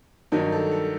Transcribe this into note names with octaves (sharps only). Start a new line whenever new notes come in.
G2 D#3 F#3 D#4
A4
A4